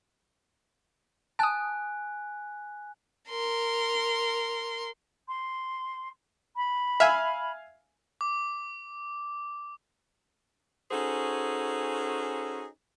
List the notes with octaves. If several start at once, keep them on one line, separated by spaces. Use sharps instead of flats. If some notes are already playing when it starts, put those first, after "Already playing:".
G#5 A5 D#6 F#6
A#4 C6
C6
B5
E5 F5 G#5
D6
C#4 D#4 F#4 G#4 A4 C5